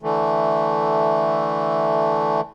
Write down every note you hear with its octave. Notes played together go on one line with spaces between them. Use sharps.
D3 E3 A3